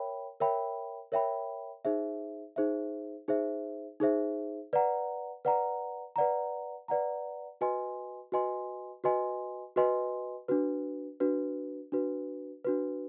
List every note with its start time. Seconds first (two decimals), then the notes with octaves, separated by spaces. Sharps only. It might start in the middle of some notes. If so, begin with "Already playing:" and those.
Already playing: A#4 C#5 E5 G5 B5
0.40 A#4 C#5 E5 G5 B5
1.12 A#4 C#5 E5 G5 B5
1.85 D#4 G#4 C5 E5
2.56 D#4 G#4 C5 E5
3.28 D#4 G#4 C5 E5
4.00 D#4 G#4 C5 E5
4.73 B4 D5 F#5 A#5
5.45 B4 D5 F#5 A#5
6.16 B4 D5 F#5 A#5
6.88 B4 D5 F#5 A#5
7.61 F#4 B4 D#5 G#5 C6
8.32 F#4 B4 D#5 G#5 C6
9.04 F#4 B4 D#5 G#5 C6
9.76 F#4 B4 D#5 G#5 C6
10.48 D4 F#4 B4
11.20 D4 F#4 B4
11.92 D4 F#4 B4
12.65 D4 F#4 B4